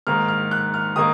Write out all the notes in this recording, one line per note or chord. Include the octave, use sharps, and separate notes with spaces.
G#2 D#3 A#3 D#4 F6
F6
F#6
F6
D#3 A#3 D#6